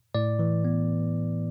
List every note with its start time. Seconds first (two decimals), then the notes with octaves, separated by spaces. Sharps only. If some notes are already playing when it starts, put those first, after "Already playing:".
0.15 A2 D5
0.39 E3
0.65 B3